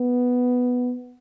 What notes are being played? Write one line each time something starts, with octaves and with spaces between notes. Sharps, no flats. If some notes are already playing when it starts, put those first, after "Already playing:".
Already playing: B3